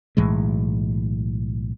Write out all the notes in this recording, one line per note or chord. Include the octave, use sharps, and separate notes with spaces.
B1 A2 E3 G#3